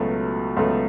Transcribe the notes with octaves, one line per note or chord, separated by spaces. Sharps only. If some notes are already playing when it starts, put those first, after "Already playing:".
Already playing: C#2 B2 F#3 A3
C#2 B2 F#3 A3